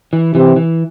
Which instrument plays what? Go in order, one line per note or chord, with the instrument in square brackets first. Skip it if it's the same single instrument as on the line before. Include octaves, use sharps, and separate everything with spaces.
[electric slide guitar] E3
[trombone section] C3 [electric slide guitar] E3
[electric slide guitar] E3